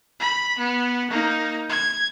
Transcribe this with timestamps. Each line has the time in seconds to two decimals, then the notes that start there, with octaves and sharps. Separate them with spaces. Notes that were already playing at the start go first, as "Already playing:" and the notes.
0.20 B5
0.58 B3
1.11 A#3 D#4
1.69 G#6